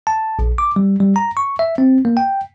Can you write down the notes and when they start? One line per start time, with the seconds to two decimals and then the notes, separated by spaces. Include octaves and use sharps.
0.07 A5
0.39 A#1
0.58 D6
0.76 G3
1.00 G3
1.16 A#5
1.37 C#6
1.59 E5
1.78 C4
2.05 A#3
2.17 G5